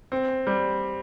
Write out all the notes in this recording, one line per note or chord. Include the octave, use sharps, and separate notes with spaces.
C4
G3